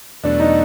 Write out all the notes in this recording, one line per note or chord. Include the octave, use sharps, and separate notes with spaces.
E2 B2 F#3 A3 D4
D#4